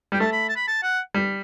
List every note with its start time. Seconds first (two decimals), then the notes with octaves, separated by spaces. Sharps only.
0.12 G3 G5
0.20 A3 A5
0.32 B5
0.49 A5
0.56 B5
0.68 A5
0.83 F#5
1.14 G3